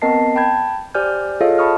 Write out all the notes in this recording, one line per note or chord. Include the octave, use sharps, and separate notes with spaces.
B3 C4 A#4 D#5 A5 C7
G5 A5 B5 G6 G#6
G4 C5 D5 G#5 F6 G6
F4 G#4 A4 C#5 D#5 F5
A5 B5 C#6 D#6 F6